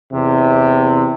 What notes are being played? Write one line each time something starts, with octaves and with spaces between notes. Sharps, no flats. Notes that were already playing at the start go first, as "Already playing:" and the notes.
E2 C3